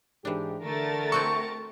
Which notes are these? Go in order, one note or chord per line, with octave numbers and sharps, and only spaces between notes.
G#2 E3 D4 G4
D3 A3 A#4 A6
C4 F#4 A4 C#6